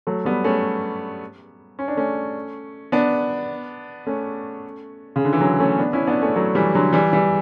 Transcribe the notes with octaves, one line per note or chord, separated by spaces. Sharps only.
F#3 A3
G3 B3
A3 C#4
C#4
D4
A3 C#4
B3 D4
A3 C#4
C#3
D3
E3
D3 F#3
A3 C#4
B3 D4
C#4 E4
B3 D4
A3 C#4
F#3 A3
E3 G3
D3 F#3
E3 G3
E3 G3